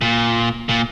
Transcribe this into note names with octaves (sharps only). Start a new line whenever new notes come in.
A#2
A#2